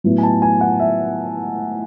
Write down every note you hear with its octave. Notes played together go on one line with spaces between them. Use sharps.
A2 F#3 B3
G#5
A5
G#5
F#5
E5